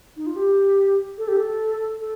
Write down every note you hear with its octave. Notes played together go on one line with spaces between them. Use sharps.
D#4
F4
G4
A4
G4
A4
A4